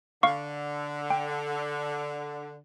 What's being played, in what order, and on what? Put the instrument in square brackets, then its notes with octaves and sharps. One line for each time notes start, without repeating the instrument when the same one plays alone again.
[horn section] D3 [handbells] F5 C#6
[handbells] G5